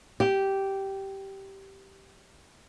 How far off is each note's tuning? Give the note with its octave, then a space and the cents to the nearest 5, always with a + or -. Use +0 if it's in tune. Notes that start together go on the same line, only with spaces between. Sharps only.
G4 -10